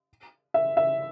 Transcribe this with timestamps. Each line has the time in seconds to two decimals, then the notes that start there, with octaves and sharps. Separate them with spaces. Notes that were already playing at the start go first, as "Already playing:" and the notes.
0.54 E5
0.77 E5